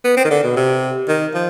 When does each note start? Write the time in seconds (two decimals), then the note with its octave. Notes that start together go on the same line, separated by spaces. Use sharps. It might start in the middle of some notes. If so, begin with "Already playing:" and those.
0.05 B3
0.17 C4
0.25 D#3
0.31 D3
0.44 B2
0.56 C3
1.08 D#3
1.34 F3